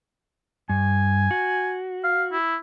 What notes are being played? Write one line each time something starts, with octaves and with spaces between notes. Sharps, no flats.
G2 G#5
F#4
F5
E4